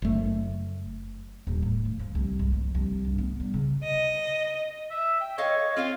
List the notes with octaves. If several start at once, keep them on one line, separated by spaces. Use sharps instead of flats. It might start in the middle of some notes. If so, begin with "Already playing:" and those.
F#1 A3
D#1
A2
F3
F3
C2
G#3
F3
C2
G2
B3
G3
C#3
D#5
E5
G5
A4 C#5 D#5 F5
C4 F4 C#5 F5